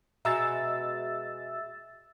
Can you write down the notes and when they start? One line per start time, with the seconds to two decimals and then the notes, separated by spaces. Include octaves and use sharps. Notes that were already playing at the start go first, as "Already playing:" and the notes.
0.25 B2 G#3 E5 A#5 E6 A6